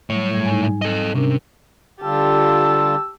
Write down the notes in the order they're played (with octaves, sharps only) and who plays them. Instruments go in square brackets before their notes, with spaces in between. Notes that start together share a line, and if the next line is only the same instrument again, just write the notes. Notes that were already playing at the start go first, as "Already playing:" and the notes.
[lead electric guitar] A2 C#5 [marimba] F#3 G3
[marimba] G#2 G3 G#6
D#4 G#5
[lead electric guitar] A4 D#5
[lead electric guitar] C3 [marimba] C#4 D4 A#4
[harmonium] D3 G3 F4 [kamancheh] G4 A5 [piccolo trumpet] E6